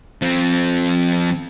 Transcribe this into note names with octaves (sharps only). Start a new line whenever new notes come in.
F3 C4